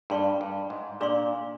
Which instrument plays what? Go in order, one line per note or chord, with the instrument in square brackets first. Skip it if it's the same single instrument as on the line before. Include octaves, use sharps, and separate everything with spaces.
[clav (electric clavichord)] G2 [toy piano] D4 G#4 D5 F5 C6
[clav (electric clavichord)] G2
G#2
[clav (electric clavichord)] A#2 [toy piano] D4 G#4 D5 F5 C6